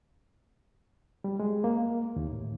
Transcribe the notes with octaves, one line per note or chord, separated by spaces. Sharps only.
G3
G#3
A#3
D#2
A2